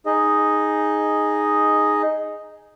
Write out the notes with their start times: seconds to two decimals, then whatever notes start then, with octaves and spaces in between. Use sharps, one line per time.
0.06 D#4 G#4 D#5